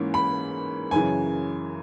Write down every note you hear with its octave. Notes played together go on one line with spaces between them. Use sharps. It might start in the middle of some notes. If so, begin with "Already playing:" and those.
Already playing: G#2 E3 A#3 C#4
B5
F#2 C#3 E3 G#5